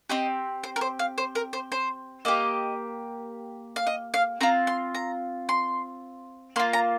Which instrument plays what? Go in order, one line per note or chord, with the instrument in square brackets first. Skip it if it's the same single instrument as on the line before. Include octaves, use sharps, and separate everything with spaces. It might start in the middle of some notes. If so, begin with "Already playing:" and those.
[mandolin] C4 G4 D#5
C5
A#4
C5
F5
C5
A#4
C5
C5
A#3 G4 D#5
F5
D#5
F5
C4 F4 A#5
C6
A#5
C6
A#3 C6
F4
A#5